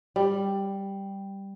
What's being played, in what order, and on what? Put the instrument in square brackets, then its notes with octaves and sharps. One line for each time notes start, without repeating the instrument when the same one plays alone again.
[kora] G3